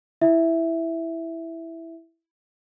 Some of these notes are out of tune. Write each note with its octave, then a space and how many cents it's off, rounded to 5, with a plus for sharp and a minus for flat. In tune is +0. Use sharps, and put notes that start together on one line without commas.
E4 +0 E5 +0